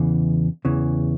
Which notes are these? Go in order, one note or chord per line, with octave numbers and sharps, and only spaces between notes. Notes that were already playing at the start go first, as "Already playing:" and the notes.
Already playing: E2 C#3 E3
E2 C#3 E3